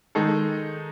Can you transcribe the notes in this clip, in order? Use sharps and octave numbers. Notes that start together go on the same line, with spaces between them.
D#3 G#3 D#4 A4